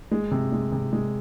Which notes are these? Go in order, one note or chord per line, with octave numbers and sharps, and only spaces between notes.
G#3
C3
G#3
C3
G#3